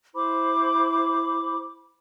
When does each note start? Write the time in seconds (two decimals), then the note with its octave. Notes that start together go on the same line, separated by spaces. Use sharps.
0.15 E4 C5 B5 D6